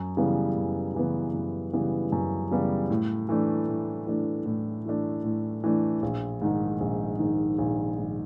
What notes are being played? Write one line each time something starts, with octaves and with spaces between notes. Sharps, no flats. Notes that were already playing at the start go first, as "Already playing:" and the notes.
Already playing: F#2
C#3 E3 G3 B3
F#2
C#3 E3 G3 B3
F#2
C#3 E3 G3 B3
F#2
C#3 E3 G3 B3
A2
E3 A3 D4
A2
E3 A3 D4
A2
E3 A3 D4
A2
E3 A3 D4
A#1
G#2 D#3
A#1
G#2 D#3
A#1
G#2 D#3